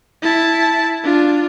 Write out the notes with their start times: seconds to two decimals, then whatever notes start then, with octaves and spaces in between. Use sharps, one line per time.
0.22 E4 A5
1.04 D4 F4